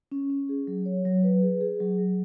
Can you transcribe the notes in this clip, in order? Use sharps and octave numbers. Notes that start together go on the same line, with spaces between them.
C#4
C#4
G#4
F#3
C#5
F#3
B4
G#4
G#4
F#3
F#3